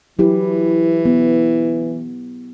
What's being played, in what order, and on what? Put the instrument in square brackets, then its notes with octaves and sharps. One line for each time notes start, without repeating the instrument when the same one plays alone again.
[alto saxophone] E3 [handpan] F#3 E4 G4
[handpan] B3